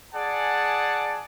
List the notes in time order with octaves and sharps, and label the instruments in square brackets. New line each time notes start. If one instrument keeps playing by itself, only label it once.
[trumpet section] G#4 D5 F#5 G#5 A5